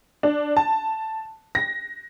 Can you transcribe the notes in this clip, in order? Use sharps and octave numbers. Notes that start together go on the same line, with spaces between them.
D4
A5
A#6